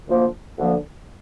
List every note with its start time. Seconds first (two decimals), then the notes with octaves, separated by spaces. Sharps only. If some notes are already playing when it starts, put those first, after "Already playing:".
0.07 D2 D3 F3 A#3
0.57 D2 D3 F3 A#3